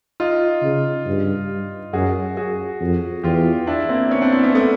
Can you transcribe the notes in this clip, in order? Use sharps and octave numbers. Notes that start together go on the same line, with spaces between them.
D#4 F4
C#3
G2
F#2 F#4 G#4
F#4 G#4
F2
E2 F4 G4
D4 E4
A#3 C4
B3 C#4
C4 D4
D4 E4
B3 C#4
A3 B3